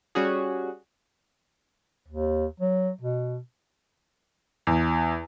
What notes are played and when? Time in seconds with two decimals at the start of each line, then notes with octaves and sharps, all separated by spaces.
0.15 G3 C#4 F#4 G#4
2.08 D#2
2.60 F#3
3.01 B2
4.67 E2